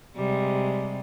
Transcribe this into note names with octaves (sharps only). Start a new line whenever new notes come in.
C3 G3 G#3